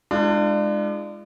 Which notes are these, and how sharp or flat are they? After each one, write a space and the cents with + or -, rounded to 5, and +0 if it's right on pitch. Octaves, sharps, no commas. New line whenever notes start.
G#3 +0 D4 +30 F4 -40